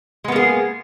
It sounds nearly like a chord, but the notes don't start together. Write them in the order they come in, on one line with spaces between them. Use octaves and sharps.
G#3 B3 A#3 G#4